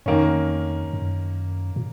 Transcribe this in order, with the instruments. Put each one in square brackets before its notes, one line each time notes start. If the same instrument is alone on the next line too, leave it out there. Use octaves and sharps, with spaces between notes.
[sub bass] F2 [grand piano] D#3 A#3 C#4
[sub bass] F#2
A#2